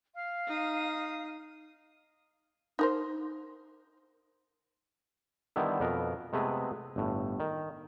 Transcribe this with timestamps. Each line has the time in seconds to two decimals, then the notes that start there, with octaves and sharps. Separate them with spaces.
0.14 F5
0.47 D#4 D#6
2.79 D#4 A#4 C5
5.56 D3 D#3 G3 B3 E4
5.80 F2 B2 B3 A#4
6.33 C3 G#3 A3 B3 G#4 B4
6.96 G1 A2
7.40 D#3